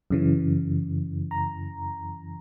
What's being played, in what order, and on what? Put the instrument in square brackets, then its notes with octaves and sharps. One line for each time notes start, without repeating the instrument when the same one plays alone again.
[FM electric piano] F#2 C#3 E3
A#5